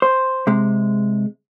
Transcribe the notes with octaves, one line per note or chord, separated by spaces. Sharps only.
C5
C3 G#3